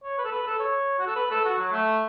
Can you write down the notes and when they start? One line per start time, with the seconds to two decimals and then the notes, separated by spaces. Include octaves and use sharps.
0.04 C#5
0.18 B4
0.25 A4
0.32 B4
0.46 A4
0.60 C#5
0.99 F#4
1.07 A4
1.16 B4
1.31 A4
1.45 F#4
1.59 F#3
1.72 A3